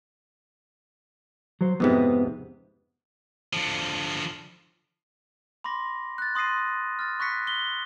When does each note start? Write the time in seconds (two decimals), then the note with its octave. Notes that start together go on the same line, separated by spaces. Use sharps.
1.61 F#3 C5
1.80 F2 G#2 C3 B3 B4
3.53 D3 F3
5.64 B5 C6 D6 A#6
6.18 F#6 A6
6.35 C6 D#6 A#6 C7 D#7
6.99 F6 A6
7.19 B5 C#6 F#6 A#6 B6 C#7
7.47 B6 G7